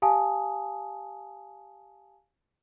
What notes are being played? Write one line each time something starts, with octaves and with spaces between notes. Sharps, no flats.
G4 F5 G#5 A5 D#6